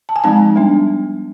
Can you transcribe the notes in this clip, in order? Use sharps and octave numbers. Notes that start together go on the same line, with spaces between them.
A5
G#5
F3 G#3 C4 D#4 A5
G3 B3 D4